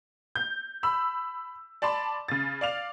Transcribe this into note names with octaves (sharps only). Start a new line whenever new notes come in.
G6
B5 E6
D5 A5 B5 C6
C#3 A6
D5 F5 F7